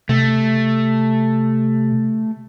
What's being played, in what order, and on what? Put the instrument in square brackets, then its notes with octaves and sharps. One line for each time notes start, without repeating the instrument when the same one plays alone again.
[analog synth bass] C3 [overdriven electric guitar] A3